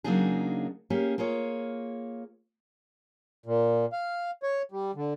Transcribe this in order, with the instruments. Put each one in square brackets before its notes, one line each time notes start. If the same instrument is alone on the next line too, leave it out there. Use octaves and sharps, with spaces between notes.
[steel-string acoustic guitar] C#3 F#3 A#3 D4 D#4 G#4
A#3 C#4 G4 G#4
A#3 F4 G#4 C#5
[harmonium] A#2
F5
C#5
G3
D3